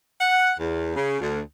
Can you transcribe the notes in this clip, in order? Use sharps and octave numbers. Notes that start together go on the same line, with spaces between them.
F#5
E2
C#3
D2